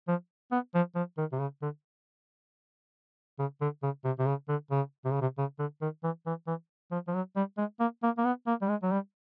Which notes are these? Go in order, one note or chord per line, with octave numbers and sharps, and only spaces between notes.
F3
B3
F3
F3
D#3
C3
C#3
D3
C#3
D3
C#3
C3
C3
C#3
D3
C#3
C3
C#3
C3
C#3
D3
D#3
E3
E3
E3
F3
F3
F#3
G3
G#3
A#3
A#3
A#3
B3
A#3
G3
G#3
F#3
G3